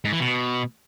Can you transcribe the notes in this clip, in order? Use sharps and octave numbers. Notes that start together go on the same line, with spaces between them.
G#2
E3
B2